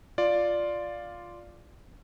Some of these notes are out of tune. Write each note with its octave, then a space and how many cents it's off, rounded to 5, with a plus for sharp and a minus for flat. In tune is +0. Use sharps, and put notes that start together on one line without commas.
F4 +0 D5 +0